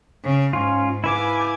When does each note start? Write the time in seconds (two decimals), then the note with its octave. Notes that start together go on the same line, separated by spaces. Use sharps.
0.22 C#3
0.53 G#2 C#4 F4
1.04 E4 B4 F5 G#5 D6